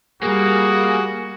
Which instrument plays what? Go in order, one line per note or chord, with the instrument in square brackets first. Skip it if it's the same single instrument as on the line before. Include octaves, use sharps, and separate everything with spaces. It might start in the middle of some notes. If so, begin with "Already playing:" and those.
[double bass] G3 [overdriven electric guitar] A#3 [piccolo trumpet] F#4 [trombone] G#4